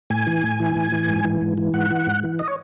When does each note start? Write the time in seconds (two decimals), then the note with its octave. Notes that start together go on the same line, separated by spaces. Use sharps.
0.10 A2 G#5
0.27 E3
0.43 A2
0.60 E3
0.75 A2
0.92 E3
1.08 G#2
1.24 E3
1.41 G#2
1.57 E3
1.74 G#2 F#5
1.90 E3
2.07 G#2
2.23 E3
2.39 D#5
2.48 C#5